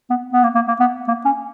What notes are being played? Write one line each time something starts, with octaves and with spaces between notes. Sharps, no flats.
B3
B3
A#3
A#3
A#3
B3
A#3
C#4